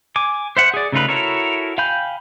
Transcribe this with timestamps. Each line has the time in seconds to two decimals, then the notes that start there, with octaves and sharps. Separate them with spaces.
0.16 G#5 D6
0.57 C5 E5 F#5
0.74 G#4 D5
0.92 C#3 A3 D#4 F4 B4
1.09 E4 F#4 A4 A#4 C#5
1.78 F5 G5 G#5 B5 G6